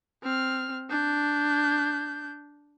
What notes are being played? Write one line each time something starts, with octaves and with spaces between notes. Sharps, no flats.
C4 F6
D4 G6